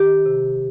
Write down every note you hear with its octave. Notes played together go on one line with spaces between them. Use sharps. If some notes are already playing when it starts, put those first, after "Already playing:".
Already playing: D#3 G4
C3